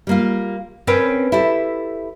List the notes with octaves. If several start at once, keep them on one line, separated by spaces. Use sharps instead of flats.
G3 A#3 F4
C4 C#4 A#4 B4 C#5 G5
E4 G4 A4